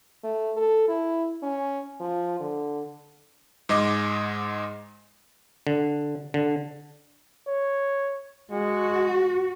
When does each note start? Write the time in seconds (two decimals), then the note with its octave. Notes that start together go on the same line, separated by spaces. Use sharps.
0.24 A3
0.57 A4
0.89 E4
1.43 C#4
2.01 F3
2.40 D3
3.69 G#2 G#3 D#5 D6
5.67 D3
6.34 D3
7.47 C#5
8.51 G#3 F#4